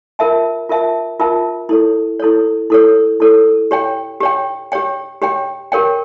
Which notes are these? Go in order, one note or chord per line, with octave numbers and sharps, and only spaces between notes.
F4 A#4 E5 A5
F4 A#4 E5 A5
F4 A#4 E5 A5
E4 A4 C#5
E4 A4 C#5
E4 A4 C#5
E4 A4 C#5
G4 C#5 G5
G4 C#5 G5
G4 C#5 G5
G4 C#5 G5
G4 A#4 C#5 G5